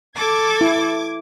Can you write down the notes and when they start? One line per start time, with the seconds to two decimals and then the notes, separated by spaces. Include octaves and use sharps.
0.17 A4 D6 G#6
0.61 E4